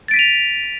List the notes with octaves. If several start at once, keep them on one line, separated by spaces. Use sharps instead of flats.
A6 B6 D7 D#7 F7